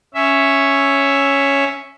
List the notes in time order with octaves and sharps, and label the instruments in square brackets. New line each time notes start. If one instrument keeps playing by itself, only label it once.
[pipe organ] C#4 E5